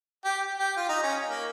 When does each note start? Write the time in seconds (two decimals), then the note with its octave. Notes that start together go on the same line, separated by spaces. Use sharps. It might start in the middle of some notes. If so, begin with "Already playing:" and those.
0.25 G4
0.59 G4
0.77 F4
0.89 D#4
1.03 C#4
1.29 A#3